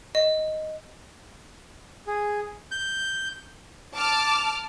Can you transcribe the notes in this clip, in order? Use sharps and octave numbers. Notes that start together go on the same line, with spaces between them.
D#5
G#4
G6
A5 D6 F6